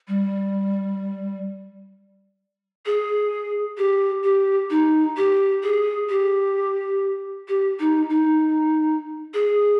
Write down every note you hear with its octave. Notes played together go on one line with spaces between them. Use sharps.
G3
G#4
G4
G4
D#4
G4
G#4
G4
G4
D#4
D#4
G#4